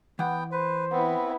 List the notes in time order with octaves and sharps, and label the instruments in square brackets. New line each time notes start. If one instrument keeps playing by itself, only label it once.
[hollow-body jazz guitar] E3 F#5 [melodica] B3 G5
[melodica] B4 [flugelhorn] C5
[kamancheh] B3 E4 [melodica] C4